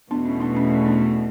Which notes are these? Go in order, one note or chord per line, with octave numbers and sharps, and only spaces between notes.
E2 B2 A3 B3 D4
C#4
B3 D4
C#4
C#4
B3 D4